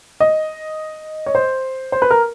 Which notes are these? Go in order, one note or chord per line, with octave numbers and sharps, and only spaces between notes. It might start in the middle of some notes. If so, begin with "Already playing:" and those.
D#5
C#5
C5
C5
B4
A#4